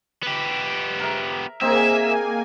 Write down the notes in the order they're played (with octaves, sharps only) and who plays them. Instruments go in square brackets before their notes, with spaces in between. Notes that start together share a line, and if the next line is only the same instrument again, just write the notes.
[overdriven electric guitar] B3 G4
[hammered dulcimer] A#4 E5
[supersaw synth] A#3 G#5 [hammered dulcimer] C4 D#4 G#4 [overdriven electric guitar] E5